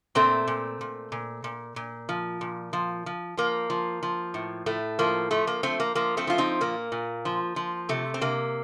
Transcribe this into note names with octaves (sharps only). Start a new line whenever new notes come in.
A#2 A3 C4
A#2
A#2
A#2
A#2
A#2
F3
A#2
F3
F3
F3 A#3
F3
F3
A2
A2 A3
F3 A#3
F3 A3
A#3
F3 A3 C4
A#3
F3 A#3
A3 C4
F3 F4
C4 D#4
A#2 A#3
A#2
F3
F3
C3 A3
C4
C3 A#3